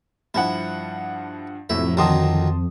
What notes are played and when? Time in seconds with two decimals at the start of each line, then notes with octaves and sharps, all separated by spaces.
0.34 G2 F3 E4 F#5
1.70 F2 A2 C3 F#3 E5
1.97 D2 D#3 F#3 A5 C6 D#6